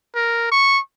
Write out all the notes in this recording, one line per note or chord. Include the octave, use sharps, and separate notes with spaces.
A#4
C#6